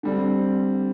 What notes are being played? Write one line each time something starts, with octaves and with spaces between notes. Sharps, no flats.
D3 G3 C4